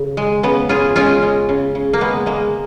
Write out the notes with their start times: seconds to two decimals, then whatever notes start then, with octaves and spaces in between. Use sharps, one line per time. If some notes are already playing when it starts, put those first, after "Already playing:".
Already playing: C#3
0.17 G#3
0.43 C#3 B3
0.69 C#3 F4 G#4
0.96 G#3 C#4 F4
1.23 G#3
1.49 C#3
1.75 C#3
1.93 A#3
2.01 G#3 B3
2.26 G#3 A#3